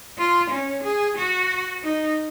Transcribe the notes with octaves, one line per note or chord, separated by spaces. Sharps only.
F4
C#4
G#4
F#4
D#4